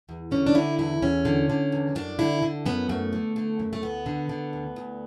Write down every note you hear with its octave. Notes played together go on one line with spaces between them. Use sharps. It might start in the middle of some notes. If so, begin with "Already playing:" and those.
E2
D3 C#4
D4
D3 E4
E2 E4
E2 C#4
D3
D3
E2
F#2 D4
D3 E4
D3
F#2 B3
F#2 A3
D3
D3
F#2
A3
D2 B3
D3
D3
D2
D2